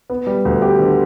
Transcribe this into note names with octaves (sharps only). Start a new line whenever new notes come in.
B3
G3
D2
B3 G4
D3